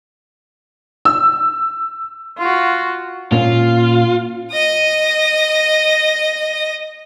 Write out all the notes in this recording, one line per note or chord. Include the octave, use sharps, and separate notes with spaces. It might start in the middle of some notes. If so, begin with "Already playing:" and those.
E6
F4 F#4
A#2 A#3 C#4 F4
D#5 D#6